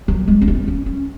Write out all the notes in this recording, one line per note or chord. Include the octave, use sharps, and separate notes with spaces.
F#3
G#3
C#4
B3
C#4
C#4